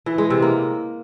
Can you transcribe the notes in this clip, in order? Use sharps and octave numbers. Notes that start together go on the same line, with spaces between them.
E3
G#3
C3
A#3